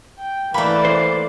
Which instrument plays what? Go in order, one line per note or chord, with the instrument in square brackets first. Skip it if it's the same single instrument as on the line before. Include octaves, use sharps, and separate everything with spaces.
[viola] G5
[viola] E3 D5 [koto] A3 A#3 [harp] B5
[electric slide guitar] C5